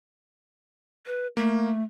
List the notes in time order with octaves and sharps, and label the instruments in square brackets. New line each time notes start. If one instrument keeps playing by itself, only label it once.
[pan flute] B4
[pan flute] A3 [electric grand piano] A#3